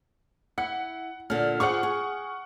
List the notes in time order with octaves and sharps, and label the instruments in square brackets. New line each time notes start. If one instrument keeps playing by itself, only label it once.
[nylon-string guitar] E4 [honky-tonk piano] F#5
[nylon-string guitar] A#2 D3 [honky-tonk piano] F6
[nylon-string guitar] F4 G#4 C5 [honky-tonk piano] F#5 C#6
[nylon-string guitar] G#4